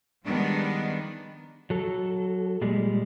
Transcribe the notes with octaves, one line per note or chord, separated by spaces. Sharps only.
D#3 F3 G3 G#3 B3 D4
F#3 A4
A#2 G3 G#3